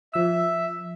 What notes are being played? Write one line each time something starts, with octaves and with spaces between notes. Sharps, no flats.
F3 E5 E6